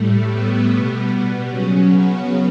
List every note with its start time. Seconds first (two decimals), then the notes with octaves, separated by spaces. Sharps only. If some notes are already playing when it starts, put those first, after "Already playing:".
Already playing: A2 G3 A3
0.31 B3
0.72 B2 G3
1.12 B3
1.50 C#3 F#3 C#4
1.90 B3